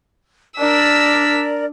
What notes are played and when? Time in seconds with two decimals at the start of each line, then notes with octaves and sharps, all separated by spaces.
0.59 D4 A#4 D5 E6 B6